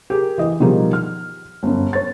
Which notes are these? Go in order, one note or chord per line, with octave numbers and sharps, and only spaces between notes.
G4 G#4 A#4
E3 D#5
B2 D#3 F3 G3 D#4 G#4
F6
G1 F#2
C#5 A6